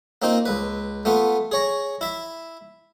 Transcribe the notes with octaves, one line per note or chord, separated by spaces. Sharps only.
A#3 C4 D#4 F4
C#2 B4
A3 B3 F4
G#4 C#5 A#5
E4 E5